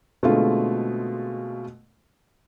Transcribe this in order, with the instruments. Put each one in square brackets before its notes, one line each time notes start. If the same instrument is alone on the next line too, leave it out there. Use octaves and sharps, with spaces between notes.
[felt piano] B2 D3 G#3 A3 C4 F4